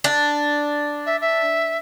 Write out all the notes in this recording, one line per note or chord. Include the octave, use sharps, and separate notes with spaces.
D4
E5
E5